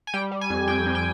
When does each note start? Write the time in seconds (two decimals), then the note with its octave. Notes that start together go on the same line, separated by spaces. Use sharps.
0.07 G#5
0.14 G3 G5
0.32 G3
0.41 G#5
0.50 F2
0.68 F2 G5
0.86 F2
0.95 G5